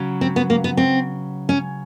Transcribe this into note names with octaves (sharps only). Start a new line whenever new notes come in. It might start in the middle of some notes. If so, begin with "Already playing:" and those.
Already playing: C#3 F#3
C4
B3
A#3
B3
C4
C#4